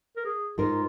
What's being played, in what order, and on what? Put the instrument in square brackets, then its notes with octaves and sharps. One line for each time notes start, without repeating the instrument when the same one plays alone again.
[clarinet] A#4
G#4
[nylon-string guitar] G#2 G#3 D#4 A#4 [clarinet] F4